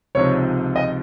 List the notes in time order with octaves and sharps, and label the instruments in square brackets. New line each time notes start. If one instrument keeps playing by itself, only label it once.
[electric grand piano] C#2 C3 F3 C4 D#4 [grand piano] C#5
[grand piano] D#5